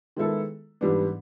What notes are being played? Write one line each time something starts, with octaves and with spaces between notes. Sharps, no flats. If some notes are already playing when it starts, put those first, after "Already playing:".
D#3 G#3 B3 E4 A4
G#2 E3 G3 B3 D4